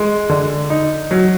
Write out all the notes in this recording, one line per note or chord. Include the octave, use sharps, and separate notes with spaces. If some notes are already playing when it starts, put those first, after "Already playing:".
Already playing: G#3
D3
D#4
F#3